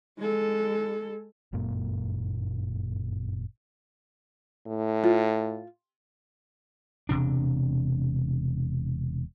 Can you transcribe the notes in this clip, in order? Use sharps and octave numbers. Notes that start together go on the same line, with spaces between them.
G#3 A4
G1 F#2 A#2 A#3
A2
F4
E1 C3 D4